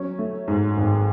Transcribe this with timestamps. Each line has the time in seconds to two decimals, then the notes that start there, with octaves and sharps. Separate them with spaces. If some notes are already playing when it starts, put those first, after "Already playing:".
Already playing: F#3 C#4 C#5
0.19 A3
0.48 G#2
0.77 G#1